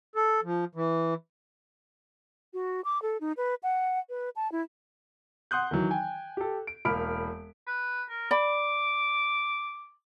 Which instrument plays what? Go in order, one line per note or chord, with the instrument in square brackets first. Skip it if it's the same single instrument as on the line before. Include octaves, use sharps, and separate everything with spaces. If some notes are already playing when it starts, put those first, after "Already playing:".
[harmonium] A4
F3
E3
[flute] F#4
D6
A4
D#4
B4
F#5
B4
A5
E4
[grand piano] F#5 C6 D#6 F#6 G6
D#3 E3 F#3
G5 G#5
G4 A4
D7
E1 A#3 B5 F6 D7
[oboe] B4
A#4
[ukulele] D5 B5 [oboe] D6